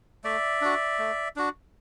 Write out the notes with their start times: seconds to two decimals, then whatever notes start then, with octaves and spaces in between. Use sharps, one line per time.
0.24 A3 D5 E5
0.61 D4 F#4
0.99 A3
1.36 D4 F#4